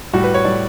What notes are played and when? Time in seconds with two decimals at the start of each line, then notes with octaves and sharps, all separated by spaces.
0.13 A2 G3 F#4
0.24 B4
0.34 C#5
0.45 A2 G3 D5